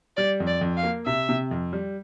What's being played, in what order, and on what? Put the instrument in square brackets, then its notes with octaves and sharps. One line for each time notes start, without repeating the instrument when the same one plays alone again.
[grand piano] G3 [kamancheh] D5
[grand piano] F2
[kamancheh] D5
[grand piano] F2
[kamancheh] F5
[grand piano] A#3
[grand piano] C3 [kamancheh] E5
[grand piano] C3
F2
G3